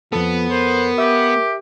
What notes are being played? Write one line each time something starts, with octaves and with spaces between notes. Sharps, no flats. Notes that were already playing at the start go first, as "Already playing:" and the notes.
F2 F3 B3 A4
A#4 C5
G4 E5